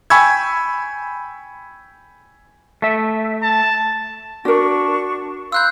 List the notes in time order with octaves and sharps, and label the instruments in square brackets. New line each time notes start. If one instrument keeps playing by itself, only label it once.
[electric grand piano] G5 G#5 B5 C#6 E6 G#6
[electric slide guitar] A3 E5
[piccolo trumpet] A5
[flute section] D4 C#6 [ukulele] F#4 A#4
[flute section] F5 B5 C6 [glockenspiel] E6 F#6 G6